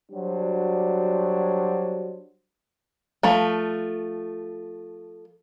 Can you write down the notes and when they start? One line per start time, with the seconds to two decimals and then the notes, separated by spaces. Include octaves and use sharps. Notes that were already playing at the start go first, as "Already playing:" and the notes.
0.12 F#3 G3 D4 F#4 C5
3.23 F3 A3